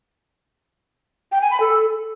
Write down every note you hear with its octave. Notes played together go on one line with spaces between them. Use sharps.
G5
G#5
B5
A4